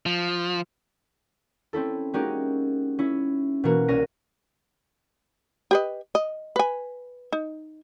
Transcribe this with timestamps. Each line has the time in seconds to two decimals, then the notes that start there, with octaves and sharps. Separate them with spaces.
0.06 F3
1.73 C4 C#4 E4 A4
2.14 G#3 A#3 C#4 D#4 F#4 G4
2.99 C#4 E4
3.64 B2 E3 A#3 F#4
3.88 C2 C#4 A#4 A#6 D#7 E7
5.71 G4 B4 D#5
6.15 D#5
6.56 B4 G#5
7.33 D#4